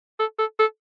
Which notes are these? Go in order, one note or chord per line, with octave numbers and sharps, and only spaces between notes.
A4
A4
A4